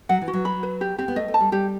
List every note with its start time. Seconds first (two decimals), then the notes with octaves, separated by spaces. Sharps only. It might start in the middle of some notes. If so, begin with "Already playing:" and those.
0.09 F#3 F#5
0.22 E3
0.28 F#4
0.33 F#3
0.45 B5
0.63 B4
0.81 G4
0.98 C4 G4
1.08 B3
1.16 A3 D#5
1.28 A3
1.34 A5
1.40 G3
1.52 G3 G4